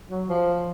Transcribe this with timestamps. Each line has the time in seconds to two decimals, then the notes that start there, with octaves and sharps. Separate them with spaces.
0.11 F#3
0.29 F3